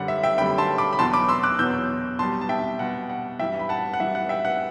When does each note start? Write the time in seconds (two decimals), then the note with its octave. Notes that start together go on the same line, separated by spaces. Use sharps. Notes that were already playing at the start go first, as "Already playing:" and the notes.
Already playing: F#2 D3 G3 F#5
0.08 E5
0.23 E5 G5
0.38 F#2 D3 G3 G5 B5
0.58 A5 C6
0.78 B5 D6
0.93 B5
0.98 E2 B2 F#3 A5 C6
1.13 B5 D6
1.29 C6 E6
1.43 D6 F#6
1.59 E2 B2 F#3 E6 G6
2.19 B2 G3 A5 C6
2.41 A5
2.49 E5 G5
2.79 B2 G3 F#5
3.10 F#5
3.39 G2 E3 G3 E5 G5
3.59 B5
3.69 F#5 A5
3.94 F#5
4.00 G2 E3 G3 E5
4.15 F#5
4.29 E5 G5
4.45 F#5